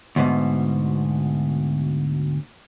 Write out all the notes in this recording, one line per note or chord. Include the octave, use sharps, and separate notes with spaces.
D2 G#2 B2